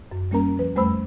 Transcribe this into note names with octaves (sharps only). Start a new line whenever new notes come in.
F#2
G3 A#3 C#4 A#4 A#5
F3 B4
F2 G3 A3 C5 B5 E6